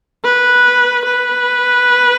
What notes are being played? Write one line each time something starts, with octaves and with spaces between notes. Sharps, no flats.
B4
B4